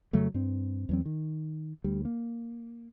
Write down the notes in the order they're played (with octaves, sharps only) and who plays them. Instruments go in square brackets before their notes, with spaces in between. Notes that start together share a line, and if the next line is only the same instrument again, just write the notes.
[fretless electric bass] F2 C#3 F#3 A3
G2 C4
E2 F#3 C4
D#3
D2 G3
A#3